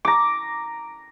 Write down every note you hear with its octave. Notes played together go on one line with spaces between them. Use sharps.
A#5 D6